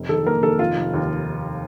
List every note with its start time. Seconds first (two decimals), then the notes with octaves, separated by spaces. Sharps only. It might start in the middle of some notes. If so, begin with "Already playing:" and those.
Already playing: F1
0.09 D#3 A4
0.26 A#3 A#4
0.43 D#3 A4
0.59 F1 F4
0.77 F1
0.94 D#2